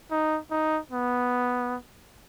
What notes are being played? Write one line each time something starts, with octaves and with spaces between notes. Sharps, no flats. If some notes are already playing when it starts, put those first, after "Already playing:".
D#4
D#4
B3